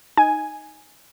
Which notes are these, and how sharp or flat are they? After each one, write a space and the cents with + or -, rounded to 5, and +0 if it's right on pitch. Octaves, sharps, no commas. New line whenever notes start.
D#4 +0 G#5 +0